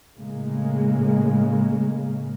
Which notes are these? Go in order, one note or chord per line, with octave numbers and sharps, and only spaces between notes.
A2 C#3 G#3 A#3